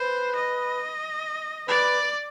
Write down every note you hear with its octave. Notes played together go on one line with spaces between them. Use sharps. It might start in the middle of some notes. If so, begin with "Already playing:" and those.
Already playing: B4 C5
D#5
B4 D5